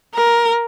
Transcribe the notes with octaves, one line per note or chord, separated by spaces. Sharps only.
A#4